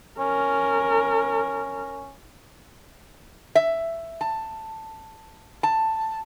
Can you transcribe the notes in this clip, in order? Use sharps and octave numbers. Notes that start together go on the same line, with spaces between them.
C#4 A#4
E5
A5
A5